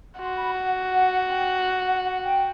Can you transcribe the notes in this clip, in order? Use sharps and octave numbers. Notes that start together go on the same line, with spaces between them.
F#4 C6
B5
F#5
F#5
G5
F#5
F#5
F#5
G5